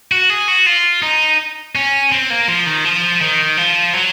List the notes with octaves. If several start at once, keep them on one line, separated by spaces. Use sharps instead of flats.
F#4
G#4
F#4
F4
D#4
C#4
C4
A#3
F3
D#3
F3
D#3
F3
F#3